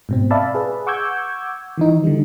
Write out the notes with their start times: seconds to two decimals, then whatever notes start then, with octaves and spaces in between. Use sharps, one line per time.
0.09 G#2 B2 C4
0.31 D5 E5 F5 A5 B5
0.55 G#4 B4
0.87 F#5 C#6 D6 E6 G6 G#6
1.78 D#3 E3 D#4
2.04 D3 G3